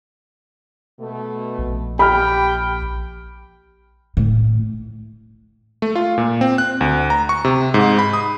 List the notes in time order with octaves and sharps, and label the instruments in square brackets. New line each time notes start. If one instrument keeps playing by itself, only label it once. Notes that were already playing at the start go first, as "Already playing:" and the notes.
[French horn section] B2 A3
[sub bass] A#1
[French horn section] G4 [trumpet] G5 [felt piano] B5 F6
[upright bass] A2
[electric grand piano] A3
F4
A#2
C4
F#6
D2
A#5
C#6
C3
G#2
B5
D#6